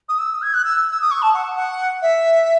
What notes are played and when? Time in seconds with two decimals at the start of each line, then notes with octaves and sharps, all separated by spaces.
0.09 D#6
0.19 E6
0.42 G#6
0.54 F#6
0.65 E6
0.91 E6
1.01 D#6
1.11 C#6
1.22 A5
1.34 F#5
1.57 F#5
2.02 E5